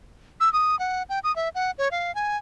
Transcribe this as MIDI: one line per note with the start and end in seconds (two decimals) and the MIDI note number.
0.40 0.52 88
0.53 0.78 87
0.79 1.03 78
1.09 1.19 79
1.24 1.34 87
1.36 1.49 76
1.55 1.71 78
1.78 1.89 73
1.91 2.14 77
2.15 2.37 80